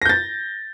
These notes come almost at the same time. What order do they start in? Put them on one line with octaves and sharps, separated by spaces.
A#6 G6 A6